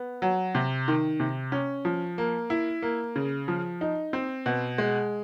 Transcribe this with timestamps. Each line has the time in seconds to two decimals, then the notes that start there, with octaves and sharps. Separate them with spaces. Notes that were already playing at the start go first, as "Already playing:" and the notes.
Already playing: B3
0.22 F#3
0.55 C3
0.88 D#3
1.20 C3
1.52 C#4
1.85 F3
2.18 A#3
2.50 E4
2.82 A#3
3.16 C#3
3.48 F3
3.81 D#4
4.13 C4
4.46 B2
4.78 G#3